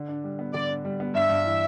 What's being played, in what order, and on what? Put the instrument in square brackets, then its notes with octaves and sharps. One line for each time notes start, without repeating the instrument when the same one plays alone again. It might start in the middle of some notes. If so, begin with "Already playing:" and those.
Already playing: [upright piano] D3
D4
G3
B3
[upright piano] D3 [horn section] D5
[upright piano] D4
G3
B3
[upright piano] G2 [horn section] E5
[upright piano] G2
E3